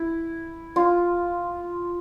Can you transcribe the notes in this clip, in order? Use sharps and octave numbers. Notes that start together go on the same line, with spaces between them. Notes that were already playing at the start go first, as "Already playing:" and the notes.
Already playing: E4
F4